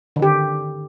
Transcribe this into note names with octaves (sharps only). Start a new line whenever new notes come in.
D3 D#3 G4